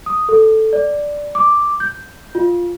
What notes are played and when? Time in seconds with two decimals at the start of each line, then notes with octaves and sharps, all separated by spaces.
0.06 D#6
0.29 A4
0.73 D5
1.35 D6
1.80 G6
2.35 F4